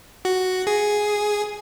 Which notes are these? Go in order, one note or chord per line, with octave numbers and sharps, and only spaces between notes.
F#4
G#4